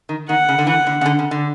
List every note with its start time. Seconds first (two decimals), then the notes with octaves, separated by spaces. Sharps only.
0.09 D#3
0.29 D#3 F#5
0.49 C#3
0.58 D3
0.67 E3 F#5
0.87 D3
1.01 C#3
1.06 D3
1.19 C#3
1.31 D3